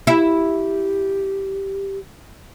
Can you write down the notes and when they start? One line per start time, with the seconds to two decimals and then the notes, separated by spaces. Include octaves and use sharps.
0.07 E4 G4